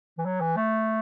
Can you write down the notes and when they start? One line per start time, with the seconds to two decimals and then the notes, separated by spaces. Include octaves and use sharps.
0.18 E3
0.25 F#3
0.41 E3
0.56 A3